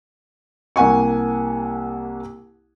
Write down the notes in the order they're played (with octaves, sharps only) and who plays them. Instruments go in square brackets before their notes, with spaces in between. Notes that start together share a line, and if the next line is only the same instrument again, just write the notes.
[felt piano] C2 A#3 F#5 G#5 C#6